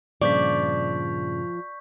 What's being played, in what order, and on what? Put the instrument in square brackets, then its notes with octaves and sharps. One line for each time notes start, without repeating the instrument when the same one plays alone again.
[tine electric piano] G2 A#2 C#3 [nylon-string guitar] F3 [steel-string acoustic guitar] D5 [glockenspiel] C#6 G6 B6